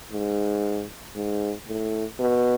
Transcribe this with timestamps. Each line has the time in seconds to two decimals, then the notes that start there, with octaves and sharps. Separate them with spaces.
0.12 G#2
1.16 G#2
1.68 A2
2.20 B2